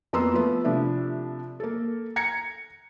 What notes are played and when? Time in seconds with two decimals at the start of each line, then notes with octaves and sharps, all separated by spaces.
0.13 F2 A#3 B3 A#5 C6 E6
0.34 F3 A3 B3
0.64 C3 F3 A3 D4 E4
1.60 A#3 A4
2.16 A#5 G#6 A#6 C#7